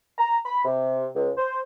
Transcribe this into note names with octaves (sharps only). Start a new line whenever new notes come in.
A#5
B5
C3
C#2
C5